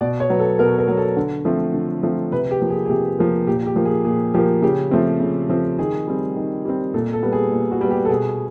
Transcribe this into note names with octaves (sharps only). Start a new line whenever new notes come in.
B2 D5
C#5
F#3 B3
A4
B2 A#4
A#4
F#3 B3
A4
D3
F3 A3 C4
D3
F3 A3 C4
C3 B4
G4
F3 A#3
G#4
G#4
C3 G4
F3 A#3
A#2 G4
G4
F3 A#3
G#4
A#2 G#4
F3 A#3 G4
C#3 G4
F3 A3 C4
C#3
F3 A3 C4
D#3 G#4
G3 C4
D#3
G3 C4
A#2 A4
A4
G3 B3
G#4
A#2
F#4
G3 B3
G4
A4
B2 G#4